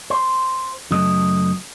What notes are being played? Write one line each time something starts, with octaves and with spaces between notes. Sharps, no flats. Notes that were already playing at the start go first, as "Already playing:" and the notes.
C5
F#2 C#3 F#3 A3 D#5